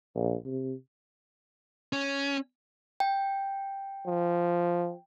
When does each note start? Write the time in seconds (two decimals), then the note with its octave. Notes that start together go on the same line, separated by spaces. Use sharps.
0.15 A#1
0.45 C3
1.93 C#4
3.00 G5
4.07 F3